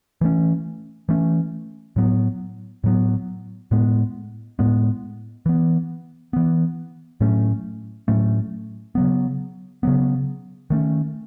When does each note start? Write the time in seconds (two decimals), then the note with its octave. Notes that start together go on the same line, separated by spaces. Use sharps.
0.21 E3 A3 C#4
1.09 E3 A3 C#4
1.96 A2 F#3 B3
2.84 A2 F#3 B3
3.71 A2 G#3 B3
4.59 A2 G#3 B3
5.46 E3 B3
6.33 E3 B3
7.21 A2 F#3 A3 C#4
8.08 A2 F#3 A3 C#4
8.95 C#3 F#3 B3
9.83 C#3 F#3 B3
10.70 D#3 A3 C#4